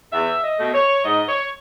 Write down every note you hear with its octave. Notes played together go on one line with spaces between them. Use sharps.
E2 E5
D#5
B2 A3
C#5
G#2 D#5
C#5